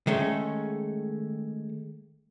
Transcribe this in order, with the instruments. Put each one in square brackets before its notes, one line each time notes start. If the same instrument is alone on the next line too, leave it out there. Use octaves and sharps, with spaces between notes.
[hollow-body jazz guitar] D#3 G#3 A3 C#4